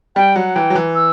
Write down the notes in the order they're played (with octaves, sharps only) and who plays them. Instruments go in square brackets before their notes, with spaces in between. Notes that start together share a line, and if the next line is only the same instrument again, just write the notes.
[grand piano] G3 [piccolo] G5
[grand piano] F#3 [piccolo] F#5
[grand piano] E3 [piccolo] G5
[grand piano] F#3
E3
[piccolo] E6